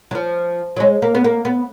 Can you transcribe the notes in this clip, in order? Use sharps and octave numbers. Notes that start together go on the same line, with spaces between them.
F#3
F3
F#3
G#3
A#3
B3
A#3
B3